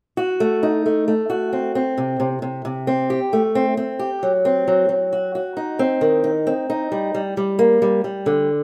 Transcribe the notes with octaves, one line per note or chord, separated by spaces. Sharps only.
F#4
A3
D#4
A3
A3
F#4
C4
C4
C3
C3
C3
C3
C4
G4
A3
C4
C4
G4
F#3
C4
F#3
F#3
F#4
F#4
D#4
C4
D#3
D#4
C4
D#4
G3
G3
G3
A#3
G3
G3
D3